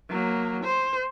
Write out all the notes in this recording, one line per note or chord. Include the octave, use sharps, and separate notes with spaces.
F#3 A#3
C5